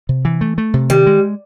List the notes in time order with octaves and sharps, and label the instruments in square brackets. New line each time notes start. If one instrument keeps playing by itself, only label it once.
[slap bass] C3
E3
A3
A3
C3
[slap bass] D#3 [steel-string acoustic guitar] G3
[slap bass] G#3